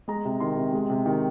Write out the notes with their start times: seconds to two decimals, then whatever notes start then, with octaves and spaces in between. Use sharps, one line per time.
0.08 G#3 A#5
0.25 C3
0.40 D#3 C6
0.57 C3
0.73 G#3
0.90 C3
1.06 D#3